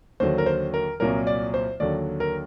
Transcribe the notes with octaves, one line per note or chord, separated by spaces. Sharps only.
D#2 D3 F#3 C5
A#4
C5
A#4
C2 A#2 F#3 A#4
D5
C5
D#2 D3 F#3 D5
A#4